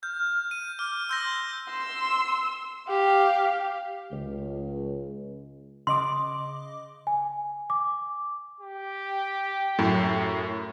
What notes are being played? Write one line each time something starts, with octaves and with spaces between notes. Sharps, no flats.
F6 G6
D#7
D6 F6
C6 E6 G6 A#6
C6 E6
G4 F5
C#2
C#3 D#5 C6 D6
G#5
D6
G4
F#2 A2